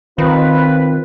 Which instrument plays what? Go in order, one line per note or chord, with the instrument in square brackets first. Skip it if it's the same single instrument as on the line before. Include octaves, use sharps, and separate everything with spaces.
[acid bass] D#3 [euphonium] C4 [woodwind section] F4 B4